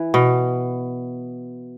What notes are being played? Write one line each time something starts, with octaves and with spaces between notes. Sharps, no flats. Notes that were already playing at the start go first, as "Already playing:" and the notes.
Already playing: E3
B2